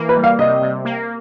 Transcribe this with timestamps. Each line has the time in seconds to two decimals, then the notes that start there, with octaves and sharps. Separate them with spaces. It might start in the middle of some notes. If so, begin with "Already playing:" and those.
Already playing: E3 A#3
0.09 B4
0.16 G3
0.24 F5
0.39 C3 D#5
0.62 C3
0.85 A#3